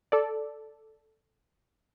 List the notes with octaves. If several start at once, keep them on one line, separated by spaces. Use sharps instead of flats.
A4 D5